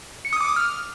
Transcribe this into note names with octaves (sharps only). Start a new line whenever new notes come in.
C#7
D#6
D6
D#6
F6